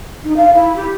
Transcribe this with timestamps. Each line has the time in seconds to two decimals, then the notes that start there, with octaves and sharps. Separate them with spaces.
0.24 D#4
0.37 F5
0.54 E4
0.76 G4